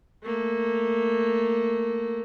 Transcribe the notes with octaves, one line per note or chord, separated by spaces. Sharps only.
A3 A#3